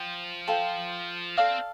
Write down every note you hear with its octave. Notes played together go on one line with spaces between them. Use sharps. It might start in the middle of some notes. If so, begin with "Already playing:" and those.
Already playing: F3 C5 G5
F4 A4 C5 G5
C4 A4 D5 F5